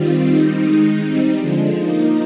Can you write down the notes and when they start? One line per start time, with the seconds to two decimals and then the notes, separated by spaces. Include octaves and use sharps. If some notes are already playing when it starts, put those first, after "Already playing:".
Already playing: D#3 G3 C4 F4
0.25 D#3 G3 C4 D#4
0.62 D#3 G#3 D#4
0.99 G3 C4 D#4
1.38 D3 F3 G#3
1.75 F3 A#3 D#4